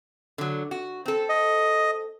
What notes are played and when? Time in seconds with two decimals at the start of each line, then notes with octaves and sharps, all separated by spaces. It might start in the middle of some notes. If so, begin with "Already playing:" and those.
0.38 D3 F#3
0.71 F#4
1.06 C4 A4
1.29 D#5